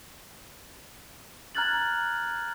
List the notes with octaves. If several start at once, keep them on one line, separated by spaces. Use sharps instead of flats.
A#5 F6 F#6 G#6 A6 F#7